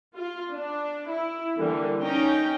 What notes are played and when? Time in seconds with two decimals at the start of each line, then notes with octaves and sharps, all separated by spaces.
0.16 F4
0.54 D4
1.10 E4
1.59 D3 E3 G3 A#3
2.01 C#4 D#4 G5